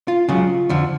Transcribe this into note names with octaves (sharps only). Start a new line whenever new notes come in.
F4
C#2 C#3 F#3 F4
F2 D3 F3